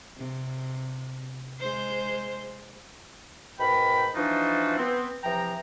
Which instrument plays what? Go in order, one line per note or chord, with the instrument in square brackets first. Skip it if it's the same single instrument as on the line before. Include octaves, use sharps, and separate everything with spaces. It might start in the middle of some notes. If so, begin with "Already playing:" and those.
[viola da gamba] C3
G#3 C5
[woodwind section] G#2 B2 A#4 G5 B5
E3 F3 D4 D#4 F4 F#4
B3 C4
C3 E3 F3 G5 A#5